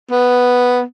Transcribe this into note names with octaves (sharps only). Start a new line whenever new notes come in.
B3